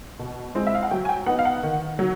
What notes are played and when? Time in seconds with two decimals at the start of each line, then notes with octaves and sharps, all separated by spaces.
0.19 B2
0.55 G#3 C4 E4
0.67 E5
0.75 F5
0.83 F#5
0.91 F#3 G5
1.05 G#5
1.09 G5
1.26 B3 D#4 F#5
1.39 F5
1.45 F#5
1.63 D#3
1.99 F#3